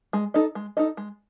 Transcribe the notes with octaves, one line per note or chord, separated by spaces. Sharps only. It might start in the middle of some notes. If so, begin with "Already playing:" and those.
G#3
D#4 A4 D#5
G#3
D#4 A4 D#5
G#3